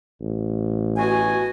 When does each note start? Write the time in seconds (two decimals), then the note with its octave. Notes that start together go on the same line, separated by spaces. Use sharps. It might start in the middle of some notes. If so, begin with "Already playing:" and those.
0.21 A1
0.97 B2 F#4 G#5